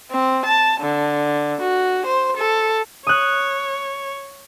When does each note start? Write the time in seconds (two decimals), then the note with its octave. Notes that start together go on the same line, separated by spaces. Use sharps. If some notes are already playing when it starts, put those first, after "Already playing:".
0.11 C4
0.45 A5
0.81 D3
1.61 F#4
2.06 C5
2.37 A4
3.07 C#5 D#6 F#6